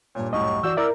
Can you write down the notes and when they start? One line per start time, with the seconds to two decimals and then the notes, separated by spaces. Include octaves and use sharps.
0.15 G2 A#2 C#5
0.33 C2 F#2 A2 D#5 C#6
0.63 E3 F#4 D5 E6 G6
0.77 E4 A#4 D5 E5 E6